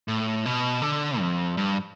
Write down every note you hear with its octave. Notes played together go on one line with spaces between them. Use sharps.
A2
B2
D3
F2
G2